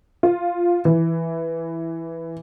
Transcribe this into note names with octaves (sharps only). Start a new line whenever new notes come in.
F4
E3